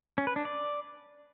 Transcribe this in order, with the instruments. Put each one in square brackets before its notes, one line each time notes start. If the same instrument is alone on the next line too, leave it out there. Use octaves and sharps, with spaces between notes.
[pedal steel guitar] C#4
B4
D4
D5